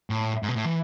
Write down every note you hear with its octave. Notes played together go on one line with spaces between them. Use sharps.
A2
G#2
B2
A2
E3